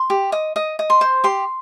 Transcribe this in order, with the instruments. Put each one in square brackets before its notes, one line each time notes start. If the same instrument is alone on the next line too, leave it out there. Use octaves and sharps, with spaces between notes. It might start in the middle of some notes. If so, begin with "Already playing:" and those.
Already playing: [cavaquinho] C6
G4
D#5
D#5
D#5
C6
C5
G4 C6